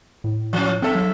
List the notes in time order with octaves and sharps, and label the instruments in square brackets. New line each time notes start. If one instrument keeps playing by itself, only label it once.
[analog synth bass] A2
[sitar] F3 C#4
[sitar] G2 A4 E5 [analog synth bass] C4
[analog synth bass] F#3